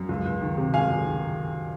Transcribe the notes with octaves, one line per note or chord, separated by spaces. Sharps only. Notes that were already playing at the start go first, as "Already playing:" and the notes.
Already playing: F#2
C#2
C#2
D#3
C3
C#2 F5 G#5
C#2
D#3